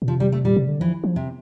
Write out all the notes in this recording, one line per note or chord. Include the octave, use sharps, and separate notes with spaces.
A#2
C3 F3
G3
A3
A#2 G3
C3
D3
E3 F3
F3
C3